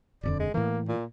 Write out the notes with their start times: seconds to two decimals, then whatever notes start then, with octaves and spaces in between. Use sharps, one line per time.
0.23 D#1 F2 D3 D5
0.39 G#3
0.54 A2 E3 A#3
0.88 A#2